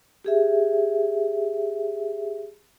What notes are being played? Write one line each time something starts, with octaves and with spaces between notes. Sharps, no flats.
G4 G#4 E5